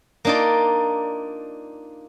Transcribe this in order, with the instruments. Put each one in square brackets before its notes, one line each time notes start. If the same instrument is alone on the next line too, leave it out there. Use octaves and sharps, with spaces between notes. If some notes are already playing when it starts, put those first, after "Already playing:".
[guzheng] A#3 D4 D#4 F4 D5